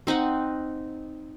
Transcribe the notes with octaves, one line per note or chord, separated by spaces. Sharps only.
C4 D#4 D#5 F#5